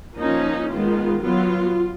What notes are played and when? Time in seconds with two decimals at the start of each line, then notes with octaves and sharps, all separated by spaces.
0.17 F3 A#3 C#4 D#4
0.70 D#3 G#3 B3 F4
1.22 F#3 B3 F4